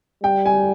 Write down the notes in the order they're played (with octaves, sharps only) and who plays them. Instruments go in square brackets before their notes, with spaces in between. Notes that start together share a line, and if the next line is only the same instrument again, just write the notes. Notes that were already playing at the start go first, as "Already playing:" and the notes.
[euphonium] G3 [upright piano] G5
[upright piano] G#5